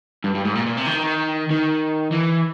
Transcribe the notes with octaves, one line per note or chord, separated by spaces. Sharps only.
G2
G2
G#2
A#2
A#2
C3
D#3
D#3
E3